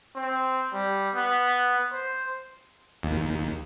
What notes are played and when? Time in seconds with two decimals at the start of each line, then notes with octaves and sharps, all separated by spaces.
0.16 C4
0.73 G3
1.15 B3
1.92 C5
3.03 D#2